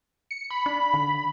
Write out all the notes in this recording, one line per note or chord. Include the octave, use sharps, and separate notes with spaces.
C#7
B5
D4
D3